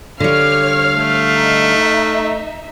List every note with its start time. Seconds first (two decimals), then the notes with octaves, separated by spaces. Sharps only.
0.20 D3 G3 C#5 F5 F6
0.95 A3
1.33 D#4 E5